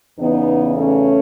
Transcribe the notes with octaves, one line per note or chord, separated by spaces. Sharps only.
E2 C#3 E3 B3 D#4
A3 C#4